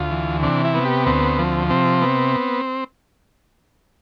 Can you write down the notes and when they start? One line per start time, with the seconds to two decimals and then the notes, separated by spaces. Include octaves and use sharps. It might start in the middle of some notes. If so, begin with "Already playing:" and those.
Already playing: D2 F4
0.11 E3
0.43 C3 D4
0.65 E4
0.75 B3
0.85 G4
1.06 D2 C4
1.39 F3
1.70 C3 C4
2.02 B3